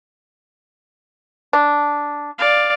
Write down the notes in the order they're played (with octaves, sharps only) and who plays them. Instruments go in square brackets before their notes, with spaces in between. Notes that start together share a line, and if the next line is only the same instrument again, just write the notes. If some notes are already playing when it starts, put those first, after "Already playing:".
[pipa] D4
[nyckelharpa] D5 F5